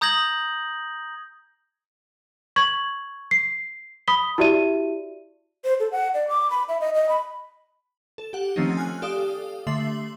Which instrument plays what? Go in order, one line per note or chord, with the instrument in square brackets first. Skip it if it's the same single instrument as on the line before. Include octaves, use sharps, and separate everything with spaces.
[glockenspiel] A#5 D#6 G6 G#6 A#6 F#7
[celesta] C#6 G#6 F#7
C7
B5 D#6 B6 G7
E4 F#4 G4 D5 E5 D#7
[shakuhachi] C5
A4
F#5
D5
D6
B5
E5
D#5
D#5
B5
[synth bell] A4
G4 F#5
D#3 F3 A3 C4 C#4 D#4
G#5 F6 F#6
G4 A4 D5 F5 D#6
D3 A3 E5 C6 C7 F#7